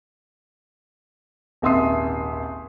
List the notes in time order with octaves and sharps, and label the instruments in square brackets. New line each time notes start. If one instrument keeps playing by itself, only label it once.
[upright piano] D#1 G#1 E5 C6 D#6 C7